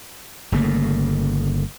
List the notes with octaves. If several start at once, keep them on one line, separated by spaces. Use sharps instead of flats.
G1 C#3 A3 A#3